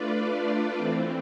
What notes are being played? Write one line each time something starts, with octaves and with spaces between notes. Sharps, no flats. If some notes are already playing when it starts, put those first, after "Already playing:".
Already playing: A3 D4 F4 B4 D5
E3 A3 C4